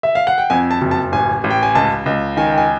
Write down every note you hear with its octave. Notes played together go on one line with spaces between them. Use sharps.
E5
F5
F#5
G5
F2 G#5
A5
F#1
A5
A1 G#5
A1
G5
G#5
C#2 A5
C#2
D#3 G#5
G5
G#5